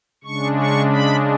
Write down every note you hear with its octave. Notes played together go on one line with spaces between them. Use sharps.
C#3 G#3 D4 C#6
C#6
B5